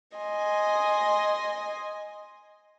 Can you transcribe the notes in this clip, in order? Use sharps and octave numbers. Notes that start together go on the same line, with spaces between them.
D#5 G#5 C6